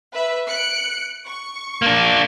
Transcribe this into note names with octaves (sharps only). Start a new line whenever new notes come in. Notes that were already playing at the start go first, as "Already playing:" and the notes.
B4 E5
F#6 C#7 D7
C#6
A#3 D4